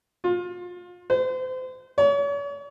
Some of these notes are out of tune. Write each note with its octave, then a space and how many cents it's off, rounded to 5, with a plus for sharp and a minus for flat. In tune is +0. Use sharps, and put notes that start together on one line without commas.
F4 +25
C5 -35
C#5 +40